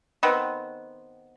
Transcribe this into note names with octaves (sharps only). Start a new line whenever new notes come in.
D#3 B3 C4